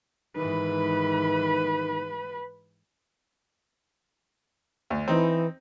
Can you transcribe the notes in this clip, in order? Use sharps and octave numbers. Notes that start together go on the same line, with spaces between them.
G#2 D#3 E3 B4 B5
D2
E3 C4 D#4